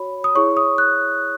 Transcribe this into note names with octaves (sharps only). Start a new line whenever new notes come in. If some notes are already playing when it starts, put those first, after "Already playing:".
Already playing: F#4 C#5 B5
D#6
E4 G#4 C#5 C#6
D#6
F#6